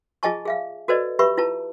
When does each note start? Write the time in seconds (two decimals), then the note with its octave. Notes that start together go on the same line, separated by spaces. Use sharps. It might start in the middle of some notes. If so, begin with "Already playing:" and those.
0.23 F4 G#4 D#5 G#5 A5 C#6
0.45 G#4 E5 F5
0.88 F#4 A4 B4 C5 D5 D#5
1.19 G4 B4 E5 B5 C#6
1.37 E4 F4 B4 A5